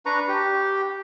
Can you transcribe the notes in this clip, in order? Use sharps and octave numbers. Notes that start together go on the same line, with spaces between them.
D4 B4 A#5 C#6
G4